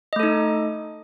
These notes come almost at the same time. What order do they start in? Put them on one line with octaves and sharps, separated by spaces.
D#5 A3 A4 D#4